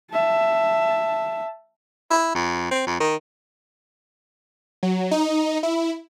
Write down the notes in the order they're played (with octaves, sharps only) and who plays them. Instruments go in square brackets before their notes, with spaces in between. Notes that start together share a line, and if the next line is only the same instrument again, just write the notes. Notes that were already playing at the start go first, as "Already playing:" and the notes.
[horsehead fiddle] E5 A5
[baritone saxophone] E4
F2
C4
F2
D#3
[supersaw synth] F#3
D#4
E4